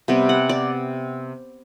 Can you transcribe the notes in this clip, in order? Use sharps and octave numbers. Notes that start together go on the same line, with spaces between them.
C3 G3 B3
F#5
D5